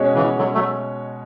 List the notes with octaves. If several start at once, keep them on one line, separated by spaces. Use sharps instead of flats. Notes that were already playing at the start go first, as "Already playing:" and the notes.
Already playing: B2 G#3 C#4 F#4 C#5
C#3 E3
D3 F#3
F#3 A3